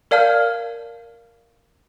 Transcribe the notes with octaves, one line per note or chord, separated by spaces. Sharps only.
A#4 D5 F5 A5 F6 G6